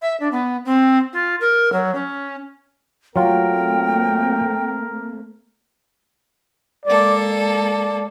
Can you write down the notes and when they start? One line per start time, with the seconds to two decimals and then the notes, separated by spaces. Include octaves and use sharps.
0.02 E5
0.20 D4
0.32 B3
0.65 C4
1.13 F4
1.40 A#4
1.72 F#3
1.95 C#4
3.16 F#3 A3 A#3 C4 F4 A#4 G5
6.85 G#3 A#3 A4 D5
7.32 D5